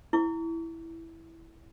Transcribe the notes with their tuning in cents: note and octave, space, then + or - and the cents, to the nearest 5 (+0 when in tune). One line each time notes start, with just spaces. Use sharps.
E4 +0 C#6 +45